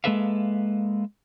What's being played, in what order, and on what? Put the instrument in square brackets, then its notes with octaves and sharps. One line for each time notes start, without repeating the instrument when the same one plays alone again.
[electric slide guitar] G#3 A#3 A4 B4 E5 F5